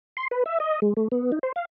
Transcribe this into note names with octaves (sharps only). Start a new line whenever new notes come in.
C6
B4
E5
D#5
G#3
A3
B3
D#4
C5
F5